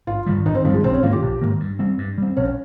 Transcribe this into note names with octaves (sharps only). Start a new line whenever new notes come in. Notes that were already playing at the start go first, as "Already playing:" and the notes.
G#1 F4
G2 D#3 G3
G#1 D#4
C4
G2 D#3 F3 G3
G#3
A#1 C4
C#4
G#2 D#3 A#3 F4
G4
A#1
G#2 D#3 A#3
G2
G3 C4
G2
G3 C4
A#1 C#4